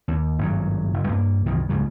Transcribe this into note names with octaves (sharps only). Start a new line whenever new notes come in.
D#2
G#1 G2 F#3
F#1
G2 A#3
C2 F#2 D#3 E3
C#2 G#2 F#3 G3